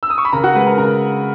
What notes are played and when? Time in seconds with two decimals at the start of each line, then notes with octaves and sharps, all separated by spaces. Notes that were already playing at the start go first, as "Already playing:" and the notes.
0.03 E6
0.10 D#6
0.18 C#6
0.25 B5
0.33 C#3 A#4 A#5
0.43 F#4 F#5
0.55 G#3 B4
0.67 A#4
0.77 C#3 A#4